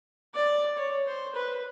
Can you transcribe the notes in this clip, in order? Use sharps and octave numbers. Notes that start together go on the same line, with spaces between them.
D5
C#5
C5
B4